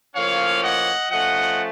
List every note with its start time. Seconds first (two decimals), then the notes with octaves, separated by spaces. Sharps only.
0.14 A2 F3 A#3 C#4 C#5 F5
0.63 D#5 F#5
1.11 F3 A3 C#4 D#5 F#5